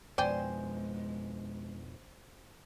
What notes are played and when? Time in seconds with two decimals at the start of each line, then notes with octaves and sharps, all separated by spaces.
0.18 F2 B2 G#3 C5 D5 G5 G#5